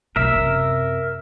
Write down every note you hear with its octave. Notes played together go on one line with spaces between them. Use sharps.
F#1 B1 A#4 E5
F#2 C3